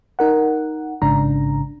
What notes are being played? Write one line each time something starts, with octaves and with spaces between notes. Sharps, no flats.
D#4 A#4 F#5
A1 G#2 C#3 D4 A#5